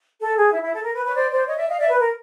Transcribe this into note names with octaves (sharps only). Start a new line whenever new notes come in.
A4
G#4
E4
E4
A4
A#4
B4
B4 C#5
C5 D5
C5 D5
C#5 D#5
D5 E5
D#5 F5
D5 E5
B4
A#4